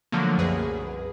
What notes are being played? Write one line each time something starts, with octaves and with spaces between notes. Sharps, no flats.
D3 F3 F#3 A3 A#3
C2 F#2 G#4 B4